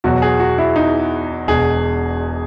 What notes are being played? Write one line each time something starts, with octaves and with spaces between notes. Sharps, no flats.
E2 B2 F#3 F#4
G#4
F#4
E4
D#4
E1 E2 B2 G#4